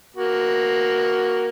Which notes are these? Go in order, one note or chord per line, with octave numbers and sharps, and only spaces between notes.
A#3 F#4